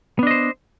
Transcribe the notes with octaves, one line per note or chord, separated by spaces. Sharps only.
B3 D4 C5 D#5